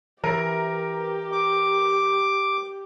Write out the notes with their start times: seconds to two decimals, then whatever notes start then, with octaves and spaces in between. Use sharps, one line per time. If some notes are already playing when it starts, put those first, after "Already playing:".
0.24 E3 G4 A#4
1.32 D6